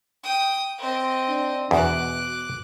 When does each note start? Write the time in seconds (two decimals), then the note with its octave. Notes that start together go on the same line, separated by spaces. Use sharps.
0.23 G5 D#6
0.78 C4 D#5
1.28 D4
1.71 E2 B2 D6 F#6